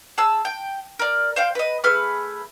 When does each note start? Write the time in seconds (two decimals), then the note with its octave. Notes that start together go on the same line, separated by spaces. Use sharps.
0.18 G#4 A5 E6
0.45 G5
0.99 A#4 D5
1.36 C5 F5 G5
1.55 B4 D#5
1.84 A3 G#4 B4 F6